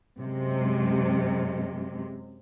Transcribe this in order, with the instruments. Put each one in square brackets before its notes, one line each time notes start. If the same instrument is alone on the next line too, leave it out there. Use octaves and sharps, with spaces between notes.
[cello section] F#2 C3 G#3